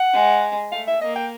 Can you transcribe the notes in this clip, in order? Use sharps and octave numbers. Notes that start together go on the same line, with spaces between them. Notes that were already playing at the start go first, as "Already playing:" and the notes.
Already playing: F#5
G#3
A3 F5
E5
A#3 D#5
G5